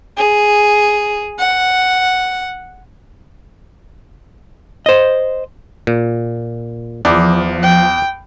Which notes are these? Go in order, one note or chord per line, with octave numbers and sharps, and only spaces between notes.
G#4
F#5
C5 D#5
A#2
E2 F3 D5
G5